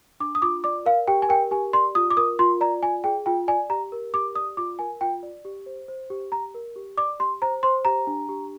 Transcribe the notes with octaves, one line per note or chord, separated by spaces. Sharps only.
D4 D6
D#6
F4 D6
D5 D6
A#4 F5
G4 G5
G#5
A#4 G5
G4 G#5
D5 C6
F4 D#6
D6
A#4 D#6
F4 C6
D5 A#5
F4 G#5
G#4 G5
F4 G5
D5 G#5
G4 A#5
A#4
G4 D6
D5 D#6
F4 D6
A#4 G#5
F4 G5
D5
G4
C5
C5
G4
G4 A#5
A#4
G4
D5 D6
G4 C6
C5 A#5
C5 C6
G4 A#5
D4
G4